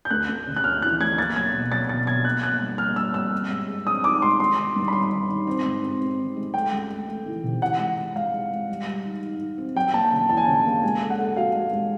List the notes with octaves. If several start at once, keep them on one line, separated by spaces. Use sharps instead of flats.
G6
D2 F#6
D2
C#3
F#6
D2 F6
E3 F#6
D2 G#6
A#3 A6
F#3 G#6
B2
F#3 A6
B2 A6
B2 G#6
A#3 F#6
A#3 F#6
G2
A#3 F6
G3 E6
G2 E6
C4
G#3
G#4
C4 D#6
D#4 D6
G#3 C6
D#3 C6
D#3
G2
B5
D#3 C6
D#3
D#3
C4
G#2
C4
C4
D#3
G#3
A3 G5
C#2
A3
A3
E3
C3
E3 F#5
G#3
G#3
G#3 F5
G#3
G#3
G3
G3
D#4
D#4
D#4
C4
F#3 G5
A#3 A5
C#3
E2 A5
G#5
C#3 A5
A#3
G#3 G#5
A4
F#5
A4
F#4 F5
G#3
G#3